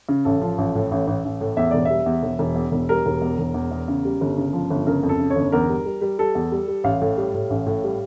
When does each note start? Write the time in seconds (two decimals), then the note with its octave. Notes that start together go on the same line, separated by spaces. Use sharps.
0.09 C#3
0.25 A1 A4
0.41 F3
0.58 A1
0.75 A2
0.91 A1
1.07 A1
1.24 A1
1.41 A2
1.57 E2 E5
1.71 E1 D5
1.85 G3 E5
2.06 E2
2.23 E1
2.39 E1
2.55 E2
2.72 E1
2.89 G3 A#4
3.06 E1
3.22 E2
3.39 E1
3.54 E2
3.71 E2
3.88 C#3
4.05 G3
4.21 G1
4.37 C#3
4.53 F3
4.70 G1
4.87 C#3 A#4
5.03 F2
5.09 A4
5.20 C#3
5.30 C#5
5.36 G1
5.52 E2 A#4
5.69 G3
5.86 G3
6.01 G3
6.19 G3 A4
6.35 E2
6.52 G3
6.68 G3
6.84 A1 F5
7.01 A2
7.17 G3
7.34 A2
7.50 A1
7.66 A2
7.84 G3